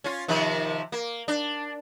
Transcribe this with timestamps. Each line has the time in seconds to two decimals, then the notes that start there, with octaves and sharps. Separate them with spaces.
0.04 C#4 F4
0.28 C3 D#3 F3
0.92 A#3
1.28 D4